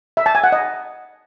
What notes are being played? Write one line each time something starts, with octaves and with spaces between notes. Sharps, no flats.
E5
A5
G#5
F#5
D#5